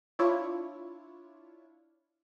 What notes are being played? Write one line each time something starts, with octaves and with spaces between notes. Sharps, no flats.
D4 E4 F4 C#5